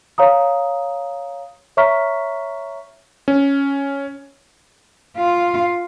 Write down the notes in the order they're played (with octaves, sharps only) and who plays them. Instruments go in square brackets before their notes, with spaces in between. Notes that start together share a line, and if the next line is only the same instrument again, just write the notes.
[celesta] C#5 F5 A#5 D#6
C#5 E5 A#5 C#6 F6 B6
[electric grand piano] C#4
[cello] F4